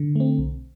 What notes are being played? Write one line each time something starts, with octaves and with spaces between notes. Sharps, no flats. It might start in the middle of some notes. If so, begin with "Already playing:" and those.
Already playing: D3
A3 C4
B1